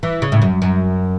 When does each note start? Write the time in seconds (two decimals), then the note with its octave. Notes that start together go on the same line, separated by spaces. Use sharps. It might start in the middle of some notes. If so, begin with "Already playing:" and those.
0.03 E3
0.22 C#3
0.32 A2
0.42 F#2
0.62 F#2